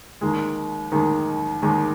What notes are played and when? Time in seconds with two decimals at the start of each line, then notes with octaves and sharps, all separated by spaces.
0.21 D#2 D#3 G#3
0.92 D#2 D#3 G#3
1.62 D#2 D#3 G#3